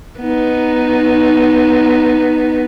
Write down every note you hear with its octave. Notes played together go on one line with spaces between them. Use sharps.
B3 D#4